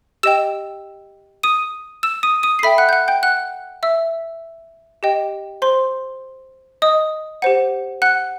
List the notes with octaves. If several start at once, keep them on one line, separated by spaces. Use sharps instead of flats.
G4 D#5 G5 E6 E7
D#6 D#7
E6 E7
D#6 D#7
D#6 D#7
C7
A4 E5 G5 B5 B6
F#5 F#6
G6
F#5 F#6
G5 G6
F#5 F#6
E5 E6
G4 D#5 G5
C5 C6
D#5 D#6
G4 C5 F#5
F#5 F#6